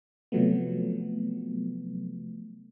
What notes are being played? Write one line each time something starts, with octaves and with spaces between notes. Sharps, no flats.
C3 F3 F#3 A3 B3